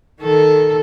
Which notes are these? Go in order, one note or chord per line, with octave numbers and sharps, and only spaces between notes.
D#3 A4